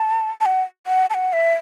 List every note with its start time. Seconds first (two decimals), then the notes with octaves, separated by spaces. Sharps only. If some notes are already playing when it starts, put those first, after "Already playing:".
Already playing: A5
0.41 A5
0.46 F#5
0.87 F#5
1.10 A5
1.14 F#5
1.33 E5